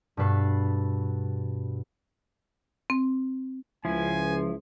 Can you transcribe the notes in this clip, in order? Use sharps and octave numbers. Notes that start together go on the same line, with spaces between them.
G2 B2 A4 B4 C7
C4
C#2 F3 E4 G#5